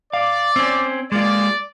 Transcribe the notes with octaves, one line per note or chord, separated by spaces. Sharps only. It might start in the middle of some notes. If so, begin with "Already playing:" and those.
D5 F5
C4 C#4
G#3 A#3 F4 D5